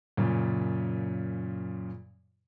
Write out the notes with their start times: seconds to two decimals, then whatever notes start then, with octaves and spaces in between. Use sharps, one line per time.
0.17 F#2 A#2 C#3